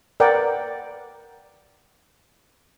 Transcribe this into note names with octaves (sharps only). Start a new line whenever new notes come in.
A#4 B4 D5 F#5 G5